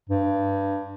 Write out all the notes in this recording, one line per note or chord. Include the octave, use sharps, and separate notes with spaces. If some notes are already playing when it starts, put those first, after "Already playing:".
G2